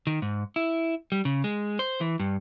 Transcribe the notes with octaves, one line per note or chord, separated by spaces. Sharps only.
D#3
G#2
E4
G3
C#3
G#3
C5
E3
G2